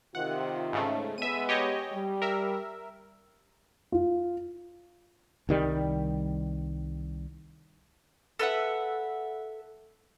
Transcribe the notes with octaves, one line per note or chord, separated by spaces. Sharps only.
C3 D#3 F4 F#5
G#2 C#3 A3
G#3 B3 E5 D#7
G4 C#5 D#5
G3
A#4 E5
F4
C2 D#3 G3
A4 B4 E5 F#5